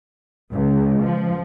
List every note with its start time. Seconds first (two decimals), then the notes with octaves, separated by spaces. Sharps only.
0.52 C#2
1.03 F3